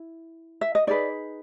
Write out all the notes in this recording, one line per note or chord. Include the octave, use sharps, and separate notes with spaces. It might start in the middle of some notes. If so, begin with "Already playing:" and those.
Already playing: E4
E5
D#5
D#4 G#4 B4 D5